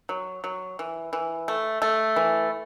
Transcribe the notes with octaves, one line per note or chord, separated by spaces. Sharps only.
F#3
F#3
E3
E3
A3
A3
E3